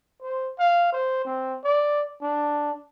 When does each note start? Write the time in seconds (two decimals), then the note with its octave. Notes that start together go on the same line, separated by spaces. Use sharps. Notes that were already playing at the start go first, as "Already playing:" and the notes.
0.22 C5
0.59 F5
0.92 C5
1.25 C4
1.64 D5
2.22 D4